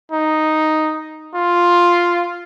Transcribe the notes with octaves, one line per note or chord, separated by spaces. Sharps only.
D#4
F4